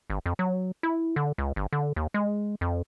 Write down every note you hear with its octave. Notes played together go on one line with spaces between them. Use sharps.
G1
F2
F#3
E4
D3
C#2
G1
D3
D#2
G#3
F2